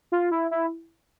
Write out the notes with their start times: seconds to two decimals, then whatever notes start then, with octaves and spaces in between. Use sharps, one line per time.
0.12 F4
0.31 E4
0.51 E4